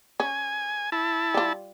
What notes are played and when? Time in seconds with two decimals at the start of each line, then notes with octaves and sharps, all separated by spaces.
0.20 C#4 G#5
0.92 E4 A5
1.34 G3 F4